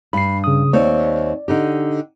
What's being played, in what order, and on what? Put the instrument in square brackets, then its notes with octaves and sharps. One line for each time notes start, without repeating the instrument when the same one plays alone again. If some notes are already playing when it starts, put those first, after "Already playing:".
[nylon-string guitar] G2 [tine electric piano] B5 C7
[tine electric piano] C#3 D#6
[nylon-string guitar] D#2 C4 C#5 [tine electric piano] D5
[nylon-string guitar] D3 D#4 G4